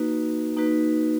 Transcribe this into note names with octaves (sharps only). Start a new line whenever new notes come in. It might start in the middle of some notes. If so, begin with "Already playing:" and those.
Already playing: A#3 D#4 F#4 B4
A#3 D#4 F#4 B4